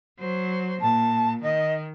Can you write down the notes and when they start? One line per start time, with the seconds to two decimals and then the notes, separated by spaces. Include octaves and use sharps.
0.19 F#3 C5
0.81 A#2 A5
1.42 D#3 D#5